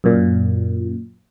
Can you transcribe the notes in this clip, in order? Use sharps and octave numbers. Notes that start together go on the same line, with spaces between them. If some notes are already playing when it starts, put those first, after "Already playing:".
F#2 A#2